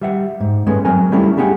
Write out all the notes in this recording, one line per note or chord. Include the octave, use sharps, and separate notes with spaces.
G3 E5 F#5
G#2
G2 G#3 A3 B3 C#4
F#3 C4 A#4 G#5
G3 A3 C#4 E4 G4 A4
B3 D4 G4 G#4 F#5